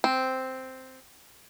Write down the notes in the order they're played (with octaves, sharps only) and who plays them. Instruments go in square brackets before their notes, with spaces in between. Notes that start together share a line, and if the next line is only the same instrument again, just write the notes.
[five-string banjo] C4